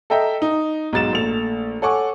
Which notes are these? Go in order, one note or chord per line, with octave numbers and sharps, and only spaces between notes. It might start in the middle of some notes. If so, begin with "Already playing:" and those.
A4 D#5 E5 G5 A#5
D#4
B1 G#2 A6 E7
A#1 A3 F7
A4 C#5 F#5 G#5 C#6 D6